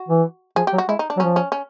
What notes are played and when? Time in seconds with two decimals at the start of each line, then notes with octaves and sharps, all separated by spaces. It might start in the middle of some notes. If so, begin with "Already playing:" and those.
Already playing: F#4
0.08 E3
0.56 F3 G#4
0.67 G4
0.73 F#3
0.78 F#4
0.89 G#3 E4
0.99 D#4
1.10 D4
1.17 F#3
1.20 F3 C#4
1.36 C#4
1.52 C#4